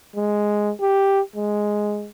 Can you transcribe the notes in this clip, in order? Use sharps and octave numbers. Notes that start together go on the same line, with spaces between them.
G#3
G4
G#3